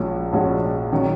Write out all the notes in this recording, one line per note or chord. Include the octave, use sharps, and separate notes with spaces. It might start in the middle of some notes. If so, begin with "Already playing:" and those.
Already playing: A#1 A#2 G#3 C#4 F#4
A#1 A#2 G#3 C#4 F#4
D#3 F#3